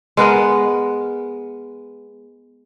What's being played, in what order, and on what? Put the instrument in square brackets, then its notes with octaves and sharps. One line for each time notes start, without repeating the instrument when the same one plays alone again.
[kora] G#3 B3 A#4